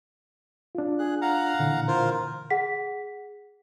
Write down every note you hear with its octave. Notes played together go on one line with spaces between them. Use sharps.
D4 F4
G#4 F#6
F5 F#5 A#5
A#2 D3 E3
F4 A#4 C5
G#4 F#5 B6